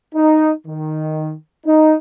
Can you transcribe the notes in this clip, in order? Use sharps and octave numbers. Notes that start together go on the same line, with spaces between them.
D#4
D#3
D#4